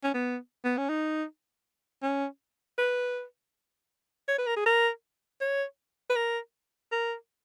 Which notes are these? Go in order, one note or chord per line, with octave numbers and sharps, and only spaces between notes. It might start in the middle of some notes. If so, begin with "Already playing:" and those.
C#4
B3
B3
C#4
D#4
C#4
B4
C#5
B4
A#4
G#4
A#4
C#5
B4
A#4
A#4